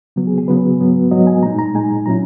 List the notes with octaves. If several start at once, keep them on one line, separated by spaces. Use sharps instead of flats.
C#3 F#3 B3
G#4
G#4
C#3 F#3 B3 B4
G#2 F#3 B3
G#2 F#3 B3 D#5
G#5
A#2 G#3 D#4 A#5
A#5
A#2 G#3 D#4 G#5
A#2 F#3 C#4 E4 A#5